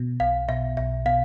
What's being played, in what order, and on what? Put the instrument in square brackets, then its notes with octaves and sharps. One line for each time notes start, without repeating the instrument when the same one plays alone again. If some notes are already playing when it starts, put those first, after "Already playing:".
Already playing: [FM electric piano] B2
[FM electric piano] B1 [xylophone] F5
[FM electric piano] B2 [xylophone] E5
[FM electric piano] B1 [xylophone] E5
[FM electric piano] B2 [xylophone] F5